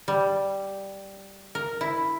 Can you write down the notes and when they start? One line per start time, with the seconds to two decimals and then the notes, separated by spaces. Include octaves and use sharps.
0.08 G3
1.55 A#4
1.81 E4